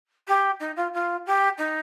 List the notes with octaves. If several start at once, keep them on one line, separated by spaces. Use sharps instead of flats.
G4
D#4
F4
F4
G4
D#4